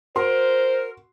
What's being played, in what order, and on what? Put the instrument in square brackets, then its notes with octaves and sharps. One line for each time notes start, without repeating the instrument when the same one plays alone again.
[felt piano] F#4 C6 [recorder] A#4 [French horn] C5